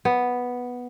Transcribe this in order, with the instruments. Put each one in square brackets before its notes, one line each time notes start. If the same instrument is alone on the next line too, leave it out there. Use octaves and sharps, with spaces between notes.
[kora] B3